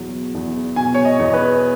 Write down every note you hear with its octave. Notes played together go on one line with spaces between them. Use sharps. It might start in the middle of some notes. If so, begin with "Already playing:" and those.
Already playing: E2 B2 F#3
E2
B2 G#5
C#5
D#5
E2
B4